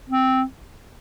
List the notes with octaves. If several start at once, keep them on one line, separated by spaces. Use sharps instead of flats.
C4